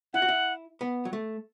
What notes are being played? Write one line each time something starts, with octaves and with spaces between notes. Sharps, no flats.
E4 F#5
F#4
E4
B3
F#3
A3